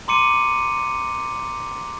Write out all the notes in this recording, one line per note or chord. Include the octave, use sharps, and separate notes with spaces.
A#5 C6 D6 C#7 D#7